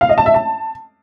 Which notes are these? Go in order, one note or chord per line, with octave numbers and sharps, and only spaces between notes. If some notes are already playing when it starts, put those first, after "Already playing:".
F5
D#5
A5
E5
A5